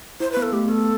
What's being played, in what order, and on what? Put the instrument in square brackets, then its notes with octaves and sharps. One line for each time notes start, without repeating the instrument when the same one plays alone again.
[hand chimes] E4 [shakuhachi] C5
[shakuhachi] B4
[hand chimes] B3
[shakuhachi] A4
[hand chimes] A3 [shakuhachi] G4
[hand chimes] B3 [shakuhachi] A4